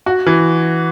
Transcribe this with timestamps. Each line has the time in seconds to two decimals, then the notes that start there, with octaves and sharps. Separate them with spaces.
0.06 F#4
0.26 E3